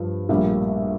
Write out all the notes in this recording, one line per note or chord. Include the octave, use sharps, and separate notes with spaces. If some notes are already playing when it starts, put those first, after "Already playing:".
Already playing: G2 F3
A#1 A2 G3 A#3